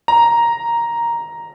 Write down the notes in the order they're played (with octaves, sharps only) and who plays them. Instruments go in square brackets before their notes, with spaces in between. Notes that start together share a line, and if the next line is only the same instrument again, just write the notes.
[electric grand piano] A#5